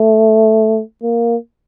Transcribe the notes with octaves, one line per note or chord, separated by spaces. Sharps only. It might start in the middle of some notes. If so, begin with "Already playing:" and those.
Already playing: A3
A#3